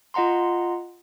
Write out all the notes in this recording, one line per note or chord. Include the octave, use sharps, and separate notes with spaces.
F4 D#5 F#5 A#5 C6